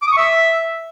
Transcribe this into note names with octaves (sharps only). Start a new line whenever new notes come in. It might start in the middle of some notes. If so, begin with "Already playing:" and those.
D6
D#6
C#6
E5